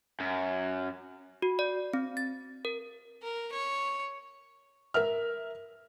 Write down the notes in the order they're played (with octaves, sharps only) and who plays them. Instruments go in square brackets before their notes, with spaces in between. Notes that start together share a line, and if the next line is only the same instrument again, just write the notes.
[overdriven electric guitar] F#2
[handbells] F#4
D5
C4
A6
A#4
[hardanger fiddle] A#4
C#5
[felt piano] A#4 E5 F6